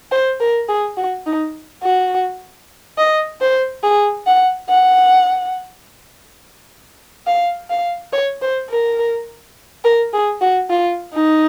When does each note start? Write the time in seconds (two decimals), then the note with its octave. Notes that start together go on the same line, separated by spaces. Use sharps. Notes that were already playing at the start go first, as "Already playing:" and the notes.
0.12 C5
0.40 A#4
0.69 G#4
0.97 F#4
1.26 D#4
1.83 F#4
2.98 D#5
3.41 C5
3.83 G#4
4.27 F#5
4.69 F#5
7.27 F5
7.70 F5
8.13 C#5
8.42 C5
8.70 A#4
9.84 A#4
10.13 G#4
10.41 F#4
10.70 F4
11.13 D#4